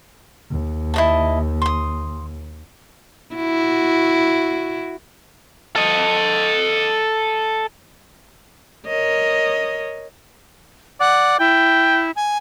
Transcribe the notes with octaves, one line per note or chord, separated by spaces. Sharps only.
D#2
E4 D#5 A5
C6 D#6
E4 F#4
A4 D#5
A#4 C#5 D#5
D5 F#5
E4 G5
G#5